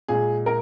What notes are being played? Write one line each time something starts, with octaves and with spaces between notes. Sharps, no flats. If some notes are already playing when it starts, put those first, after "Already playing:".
A#2 G#3 G#4
A#4